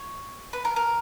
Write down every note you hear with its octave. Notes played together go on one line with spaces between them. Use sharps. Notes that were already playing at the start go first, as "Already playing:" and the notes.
Already playing: C#5
B4
A#4
A#4